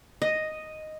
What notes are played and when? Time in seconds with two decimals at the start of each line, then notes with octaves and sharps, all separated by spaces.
0.22 D#5